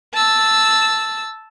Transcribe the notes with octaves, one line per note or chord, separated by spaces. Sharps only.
A5 E6